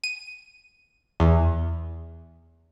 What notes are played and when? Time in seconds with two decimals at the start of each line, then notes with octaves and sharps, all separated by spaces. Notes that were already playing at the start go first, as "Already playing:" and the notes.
0.04 D#7
1.20 E2